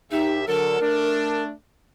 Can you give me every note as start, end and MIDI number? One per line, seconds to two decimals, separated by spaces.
0.11 0.44 39
0.11 0.39 63
0.11 0.44 67
0.11 0.44 76
0.47 0.78 50
0.47 0.78 54
0.47 0.78 69
0.47 1.41 70
0.80 1.51 57
0.80 1.51 62